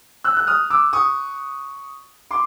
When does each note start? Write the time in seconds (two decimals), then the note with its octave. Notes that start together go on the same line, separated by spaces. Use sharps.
0.24 E6 F#6
0.37 F#6
0.47 D#6 F6
0.70 D6 E6
0.93 C#6 D#6
2.31 C6 D6